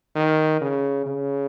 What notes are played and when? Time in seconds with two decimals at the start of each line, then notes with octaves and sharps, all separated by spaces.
0.15 D#3
0.61 C#3
1.06 C#3